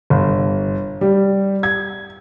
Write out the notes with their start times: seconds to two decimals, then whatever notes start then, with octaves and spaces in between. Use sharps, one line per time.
0.10 G1
1.01 G3
1.63 G#6